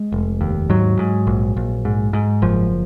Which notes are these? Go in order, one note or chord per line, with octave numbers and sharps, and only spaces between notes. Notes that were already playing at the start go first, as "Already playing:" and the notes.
Already playing: G#3
F1
D#2
G#2 F#3
G#2
A#1
A#1
G#2
G#2
F#1 F3